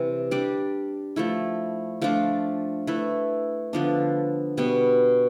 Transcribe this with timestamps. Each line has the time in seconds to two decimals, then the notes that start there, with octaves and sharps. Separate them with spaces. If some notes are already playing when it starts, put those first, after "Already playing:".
Already playing: C3 E3 G3 C4
0.31 G3 D4 G4 D5
1.16 F3 A3 E4
2.02 F3 A3 D4 F4
2.87 A3 E4 B4
3.73 D3 F3 B3 D4
4.57 B2 G3 B3